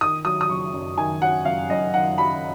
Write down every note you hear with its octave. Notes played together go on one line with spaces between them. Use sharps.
D#3 D#6
F#3 D#6
D#6
F#1 C#6
F#2
D#3 G#5
F#3 F#5
F#1 F5
F#2 D#5
D#3 F#5
F#3 B5